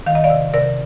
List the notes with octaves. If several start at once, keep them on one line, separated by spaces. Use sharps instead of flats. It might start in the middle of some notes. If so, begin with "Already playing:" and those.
D#3 F5
D#5
D5 F5
C3
C3 A#4 D5